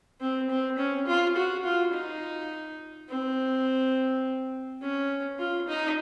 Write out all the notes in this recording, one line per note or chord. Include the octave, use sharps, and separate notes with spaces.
C4
C4
C#4
F4
F#4
F4
D#4
C4
C#4
F4
D#4